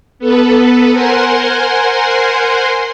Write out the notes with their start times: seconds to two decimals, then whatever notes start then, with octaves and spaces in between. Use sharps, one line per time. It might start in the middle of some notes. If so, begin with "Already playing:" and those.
0.19 B3 A4 B4
0.91 A#4 C5 F#5 G#5 C6